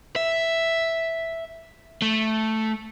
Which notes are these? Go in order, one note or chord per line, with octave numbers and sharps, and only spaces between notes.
E5
A3